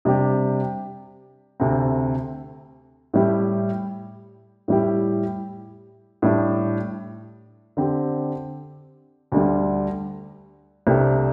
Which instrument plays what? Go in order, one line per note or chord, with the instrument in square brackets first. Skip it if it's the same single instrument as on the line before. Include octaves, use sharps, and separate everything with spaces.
[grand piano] C3 G3 D4 G4
D2 C3 A3 C4
A2 G3 E4 G4
A2 G3 E4 G4
A2 G3 D4 G4
D3 C4 G4
D2 D3 G3
C2 C3 A3 D4 G4